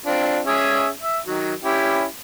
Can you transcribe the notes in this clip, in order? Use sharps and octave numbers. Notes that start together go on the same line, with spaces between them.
C4 D4 F4
C#4 G#4 E5
E5
D#3 F#3
C#4 E4 G4